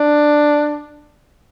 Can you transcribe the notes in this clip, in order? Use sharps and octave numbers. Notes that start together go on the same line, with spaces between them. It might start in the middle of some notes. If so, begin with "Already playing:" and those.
Already playing: D4